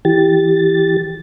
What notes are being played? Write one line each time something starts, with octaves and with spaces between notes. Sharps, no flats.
E3 G4 A6